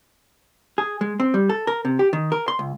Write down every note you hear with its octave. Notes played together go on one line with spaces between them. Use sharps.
G#4
G#3
C4
G3
A4
A#4
C3
G4
D#3
A#4
C6
C#2